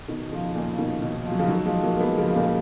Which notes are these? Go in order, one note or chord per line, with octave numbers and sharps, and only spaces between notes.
B2 D#3
C#3 F3
A#2 C#3
B2 D#3
B2 D#3
F3
F#3
C#3 F3
D#3 F#3
F3 G#3
F#3 A#3
A#3
G#3 B3
C#3 F3
A#2 C#3